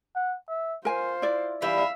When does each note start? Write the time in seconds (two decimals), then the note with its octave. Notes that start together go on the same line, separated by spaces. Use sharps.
0.16 F#5
0.49 E5
0.85 F4 A#4 C5 G#5
1.22 E4 D5
1.62 E3 G3 E5 F5